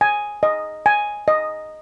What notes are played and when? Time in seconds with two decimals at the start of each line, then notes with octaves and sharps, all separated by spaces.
0.01 G#5
0.43 D#5
0.86 G#5
1.28 D#5